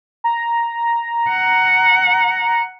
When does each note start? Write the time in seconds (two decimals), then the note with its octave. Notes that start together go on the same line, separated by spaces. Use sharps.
0.24 A#5
1.29 F#5